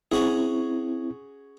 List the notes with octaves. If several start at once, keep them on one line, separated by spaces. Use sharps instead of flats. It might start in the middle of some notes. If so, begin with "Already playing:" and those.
C4 C#4 E4 F#4 G#4